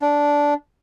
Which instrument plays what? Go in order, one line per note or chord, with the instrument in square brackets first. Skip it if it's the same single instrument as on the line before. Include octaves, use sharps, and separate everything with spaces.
[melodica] D4